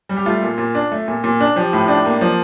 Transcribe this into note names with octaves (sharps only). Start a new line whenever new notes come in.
G3
G4
A3 F4
A#2
A#2
D4
A3
A#2
A#2
D4
F3 G4
A2
D4
A#3
F3